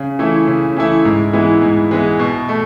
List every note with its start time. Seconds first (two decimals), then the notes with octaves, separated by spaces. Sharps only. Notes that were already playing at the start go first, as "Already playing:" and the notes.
Already playing: C#3
0.19 E3 A3 E4
0.48 C#3
0.77 E3 A3 E4
1.05 G#2
1.33 E3 G#3 B3 E4
1.62 G#2
1.91 E3 G#3 B3 E4
2.19 B2
2.49 A3